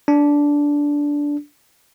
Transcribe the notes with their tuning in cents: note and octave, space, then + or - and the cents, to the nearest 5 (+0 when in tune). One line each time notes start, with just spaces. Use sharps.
D4 -10